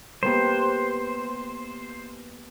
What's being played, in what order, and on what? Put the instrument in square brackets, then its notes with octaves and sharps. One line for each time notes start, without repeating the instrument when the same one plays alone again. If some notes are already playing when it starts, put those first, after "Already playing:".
[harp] A#3 B3 G4 [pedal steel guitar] C5